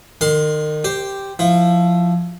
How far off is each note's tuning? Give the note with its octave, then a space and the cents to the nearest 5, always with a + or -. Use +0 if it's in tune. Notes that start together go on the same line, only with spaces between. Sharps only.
D#3 -35 F5 +35 C6 +0
G4 +0 C5 +0
F3 +0 E4 +15